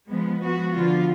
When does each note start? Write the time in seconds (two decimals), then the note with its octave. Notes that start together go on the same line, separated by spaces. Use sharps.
0.10 F3 G#3 B3
0.42 F3 B3 F#4
0.75 D3 F3 B3 F4